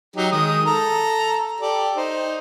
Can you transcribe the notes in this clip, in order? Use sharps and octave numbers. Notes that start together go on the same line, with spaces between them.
F#3 D#4 G4
D#3 G#3 D#6
A4 A#5
G4 A4 D5
D#4 C5